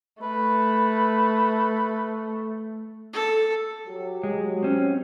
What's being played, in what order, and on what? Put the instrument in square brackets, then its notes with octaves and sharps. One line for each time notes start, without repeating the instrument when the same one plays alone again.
[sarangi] A3 [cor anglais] B4
[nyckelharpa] A4
[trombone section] F#3 G4
[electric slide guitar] G#3
C4 C#4